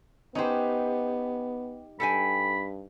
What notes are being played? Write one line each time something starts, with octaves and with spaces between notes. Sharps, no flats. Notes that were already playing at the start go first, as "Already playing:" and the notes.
B3 C#4 D#4 G4 B4 C5
G2 A4 G5 G#5 B5